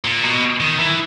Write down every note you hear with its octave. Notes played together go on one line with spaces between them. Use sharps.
A#2
B2
D#3
E3